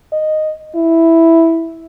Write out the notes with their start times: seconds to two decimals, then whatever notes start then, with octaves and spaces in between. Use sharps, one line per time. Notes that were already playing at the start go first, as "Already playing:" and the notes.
0.13 D#5
0.75 E4